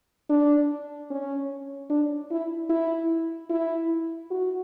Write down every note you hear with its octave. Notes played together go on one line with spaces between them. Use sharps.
D4
C#4
D4
E4
E4
E4
F#4